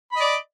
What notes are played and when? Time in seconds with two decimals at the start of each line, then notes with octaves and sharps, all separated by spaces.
0.12 B5
0.16 D#5
0.21 D5